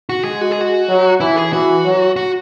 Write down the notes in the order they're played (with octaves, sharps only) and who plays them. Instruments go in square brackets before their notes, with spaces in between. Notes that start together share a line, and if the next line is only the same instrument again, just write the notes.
[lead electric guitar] F#4
[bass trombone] G#3 [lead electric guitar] G#4
[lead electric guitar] F#4
G#4
F#4
[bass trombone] F#3
[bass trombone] E3 [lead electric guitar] E4
[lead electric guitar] G#4
[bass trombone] E3 [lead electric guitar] F#4
[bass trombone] F#3
[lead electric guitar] F#4